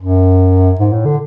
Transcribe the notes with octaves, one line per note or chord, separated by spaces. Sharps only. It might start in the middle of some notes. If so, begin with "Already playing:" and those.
F#2
G#2
A2
D3